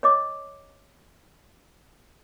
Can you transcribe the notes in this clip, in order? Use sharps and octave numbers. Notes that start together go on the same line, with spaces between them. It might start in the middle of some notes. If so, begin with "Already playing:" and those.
C#5 D#5 D6